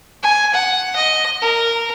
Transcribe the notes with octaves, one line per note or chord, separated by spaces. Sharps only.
G#5
F#5
D#5
A#4